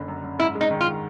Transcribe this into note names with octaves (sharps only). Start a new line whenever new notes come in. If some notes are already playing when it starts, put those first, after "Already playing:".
Already playing: F#1 D3
F#2
F#2
G#2 E4
G#3
D#4
D#3
F4